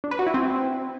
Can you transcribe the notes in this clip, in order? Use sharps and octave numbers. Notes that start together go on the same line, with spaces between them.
D4
B4
F#4
E4
C4